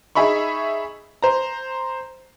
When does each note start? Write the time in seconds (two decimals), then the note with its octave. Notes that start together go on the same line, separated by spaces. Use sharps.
0.15 D#4 G#4 E5 B5 C#6
1.22 C5 A#5